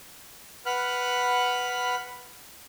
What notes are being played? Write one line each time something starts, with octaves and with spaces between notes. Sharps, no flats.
B4 F#5 B5 F6 F#6